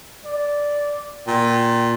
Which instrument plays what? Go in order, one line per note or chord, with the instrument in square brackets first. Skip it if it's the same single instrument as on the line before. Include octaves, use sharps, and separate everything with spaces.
[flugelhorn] D5
[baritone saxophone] A#2 [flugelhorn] G5